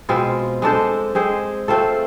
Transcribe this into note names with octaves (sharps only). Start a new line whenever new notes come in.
B2 G#3 C4 F4
G#3 D4 A4 C5
G#3 C4 G#4 C5
A3 C4 F4 A4